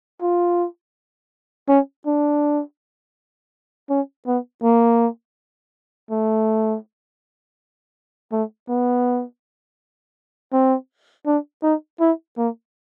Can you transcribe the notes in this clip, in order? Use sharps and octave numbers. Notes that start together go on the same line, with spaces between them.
F4
C#4
D4
C#4
B3
A#3
A3
A3
B3
C4
D4
D#4
E4
A#3